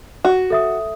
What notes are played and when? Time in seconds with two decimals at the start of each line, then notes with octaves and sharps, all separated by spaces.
0.25 F#4
0.50 A4 E5 D#6